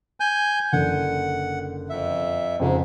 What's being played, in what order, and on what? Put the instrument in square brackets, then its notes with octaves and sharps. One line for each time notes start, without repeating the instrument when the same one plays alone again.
[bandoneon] G#5 G6
[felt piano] F#1 D3 [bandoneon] F#5
[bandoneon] F2 E5
[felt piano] F2 C#3 [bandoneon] G#2